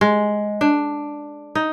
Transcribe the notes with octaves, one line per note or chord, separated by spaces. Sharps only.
G#3
D4
D#4